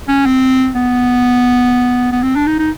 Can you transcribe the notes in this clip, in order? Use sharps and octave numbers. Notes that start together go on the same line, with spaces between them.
C#4
C4
B3
B3
C4
D4
D#4
D#4